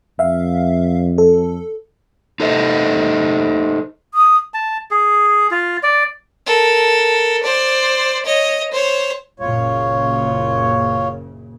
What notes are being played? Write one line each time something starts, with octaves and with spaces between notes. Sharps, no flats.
F2 E5 F5
A4
D#4 A4 C5 D#5
D#6
A5
G#4
F4
D5
A4 A#4
C5 D5
C#5 D#5
C5 C#5
F#1 A#2 C#3 F4 C#5